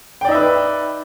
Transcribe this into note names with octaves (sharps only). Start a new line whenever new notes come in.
D#4 B4 D5 E5 G5